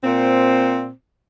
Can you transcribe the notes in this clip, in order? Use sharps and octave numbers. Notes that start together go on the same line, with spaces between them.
A#2 C4